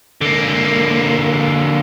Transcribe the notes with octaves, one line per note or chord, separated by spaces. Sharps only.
D3 A#3